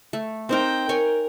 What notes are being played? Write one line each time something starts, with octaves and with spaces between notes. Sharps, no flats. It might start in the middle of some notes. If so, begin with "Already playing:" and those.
A3
C4 D#4 A#4 C5 G5
A#4 C#5 G5 G#5